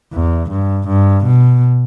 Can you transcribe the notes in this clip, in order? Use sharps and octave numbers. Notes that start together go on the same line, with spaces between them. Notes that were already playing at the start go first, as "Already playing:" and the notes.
E2
G2
G2
B2